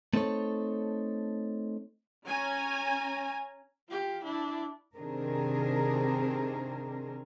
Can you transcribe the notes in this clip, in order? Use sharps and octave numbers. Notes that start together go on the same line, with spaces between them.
A3 C4 D#4 A4 C#5
C#4 G#5 A#5
F4 G4
D4 E4
C3 D#3 C4 D4 G#4 A#4